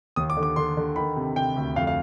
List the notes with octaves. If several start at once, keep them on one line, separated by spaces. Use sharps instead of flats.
D#2 D#6
D6
D3
D6
D3 C6
D3
D#3 B5
C3
C3 G5
D2
F2 F5
F5